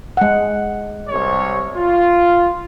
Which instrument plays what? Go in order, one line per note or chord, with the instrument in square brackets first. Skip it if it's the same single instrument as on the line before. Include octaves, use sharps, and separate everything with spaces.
[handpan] G#3 F#5
[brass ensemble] C2 C#5
F4